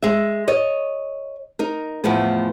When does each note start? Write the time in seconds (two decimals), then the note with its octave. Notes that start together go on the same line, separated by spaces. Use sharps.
0.02 G#3 E5
0.48 C#5 D#5
1.59 D#4 A#4
2.04 E2 A2 F3 A3 B3